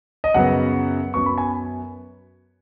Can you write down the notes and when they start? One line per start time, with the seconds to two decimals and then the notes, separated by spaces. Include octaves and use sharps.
0.24 D#5
0.34 F#2 C#3 F#3 B3 F#5
1.14 F#2 F#3 B3 C#6
1.26 B5
1.38 G#5